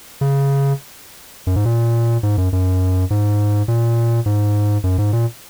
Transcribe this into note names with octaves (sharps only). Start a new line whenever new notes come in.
C#3
F#2
G#2
A#2
G#2
F#2
F#2
G#2
A#2
G#2
F#2
G#2
A#2